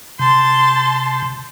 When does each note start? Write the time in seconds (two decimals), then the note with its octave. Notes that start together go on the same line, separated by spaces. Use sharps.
0.19 C3 A5 C6